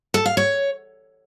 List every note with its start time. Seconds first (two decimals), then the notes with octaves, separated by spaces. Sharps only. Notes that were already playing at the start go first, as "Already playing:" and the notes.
0.14 A4
0.26 F5
0.37 C#5